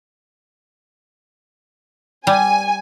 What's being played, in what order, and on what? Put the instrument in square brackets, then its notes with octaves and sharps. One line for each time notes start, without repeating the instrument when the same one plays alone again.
[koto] G3 [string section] G#5